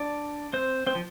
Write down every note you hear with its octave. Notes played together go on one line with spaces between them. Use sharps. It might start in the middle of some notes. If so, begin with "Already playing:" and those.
Already playing: D4 D5
C4 C5
C4 C5
F3